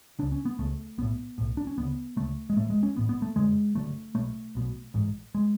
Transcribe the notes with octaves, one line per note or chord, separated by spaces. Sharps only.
C#2 C#3 D4
C#4
B3
C#2 C#3 A3
B1 A2 B3
B1 A2
D4
C#4
D2 C#3 B3
D2 C#3 A3
G#3
A1 A2 A3
G#3
C#4
A1 A2 B3
B3
A3
F#1 F#2 D3 G#3
F#1 F#2 D3 A3
B1 B2 A3
B1 B2
A1 G#2
G#3